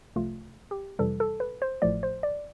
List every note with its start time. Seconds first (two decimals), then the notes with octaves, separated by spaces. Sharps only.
0.16 C2 C3 F3 A3 F4
0.71 G4
0.99 F2 C3 E3 G3 A4
1.20 A4
1.40 B4
1.62 C5
1.82 A1 A2 F3 A3 D5
2.03 C5
2.23 D5